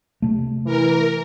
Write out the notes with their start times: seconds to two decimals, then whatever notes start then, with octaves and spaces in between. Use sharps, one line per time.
0.22 C3 A3
0.66 E3 A#4